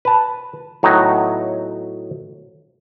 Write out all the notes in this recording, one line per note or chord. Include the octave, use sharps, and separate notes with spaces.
B4 A5
A2 F#3 B3 D#4